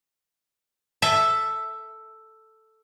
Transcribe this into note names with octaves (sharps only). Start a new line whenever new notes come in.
A4 E5